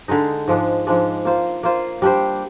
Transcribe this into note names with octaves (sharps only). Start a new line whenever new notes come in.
D3 G#3 D#4
G#2 F3 G#3 D4
G#2 F3 G#3 D4
A#3 F4 C5
A#3 F4 C5
G3 D4 G4 C5